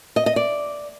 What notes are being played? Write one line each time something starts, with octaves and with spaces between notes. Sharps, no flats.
D#5
D#5
D5